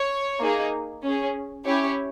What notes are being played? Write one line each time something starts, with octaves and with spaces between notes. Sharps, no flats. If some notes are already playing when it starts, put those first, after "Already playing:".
Already playing: C#5
A#3 D#4 G#4
C#4 G#4
C#4 E4 G4 C#5